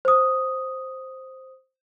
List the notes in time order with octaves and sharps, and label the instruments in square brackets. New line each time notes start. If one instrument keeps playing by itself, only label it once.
[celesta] C5 D#6